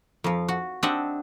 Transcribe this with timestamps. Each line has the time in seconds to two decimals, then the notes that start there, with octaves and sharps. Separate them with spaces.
0.24 F2 F3
0.48 F#4
0.83 C4 D4 G4 D#5 E5 F#5